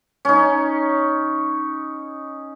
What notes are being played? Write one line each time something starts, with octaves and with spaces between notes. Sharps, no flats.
C#4 D#4